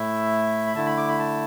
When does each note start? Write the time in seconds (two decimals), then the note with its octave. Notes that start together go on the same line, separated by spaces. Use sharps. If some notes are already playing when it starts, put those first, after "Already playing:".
Already playing: A2 A3 E4 E5
0.67 B5
0.75 D3 A3 E4 A5
0.86 B5
0.97 D6
1.09 B5
1.19 A5